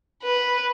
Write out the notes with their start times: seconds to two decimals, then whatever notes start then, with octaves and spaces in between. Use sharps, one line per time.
0.23 B4